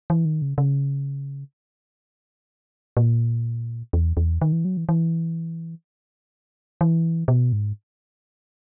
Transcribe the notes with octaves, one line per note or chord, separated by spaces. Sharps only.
E3
D#3
C#3
C#3
A#2
E2
E2
D#3
E3
F#3
E3
E3
E3
B2
G#2